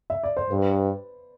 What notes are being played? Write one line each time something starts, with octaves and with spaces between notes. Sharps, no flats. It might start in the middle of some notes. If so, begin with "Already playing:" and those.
E5
D5
C5
G2 B4